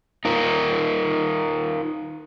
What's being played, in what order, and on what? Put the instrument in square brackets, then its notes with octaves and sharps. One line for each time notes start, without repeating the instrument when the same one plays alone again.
[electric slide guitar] D#4 F4 A#4